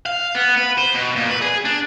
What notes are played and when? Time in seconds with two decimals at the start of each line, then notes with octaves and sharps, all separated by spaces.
0.06 F5
0.35 B3
0.57 B4
0.78 C5
0.94 B2
1.16 A#2
1.30 B4
1.41 G#4
1.65 D4